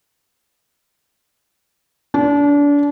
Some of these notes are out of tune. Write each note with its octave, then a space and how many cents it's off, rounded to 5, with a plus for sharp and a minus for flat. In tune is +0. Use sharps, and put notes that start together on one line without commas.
D4 -30